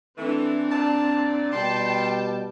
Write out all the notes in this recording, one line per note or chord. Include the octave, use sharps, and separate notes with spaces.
E3 A3 C4 D4
A#2 D5 A5
B2 G3 G5 A5 C6